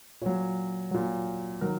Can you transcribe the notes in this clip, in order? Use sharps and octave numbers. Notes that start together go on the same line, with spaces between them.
A#2 F#3 C#5
A#2 F#3
D#3 F#3 A#4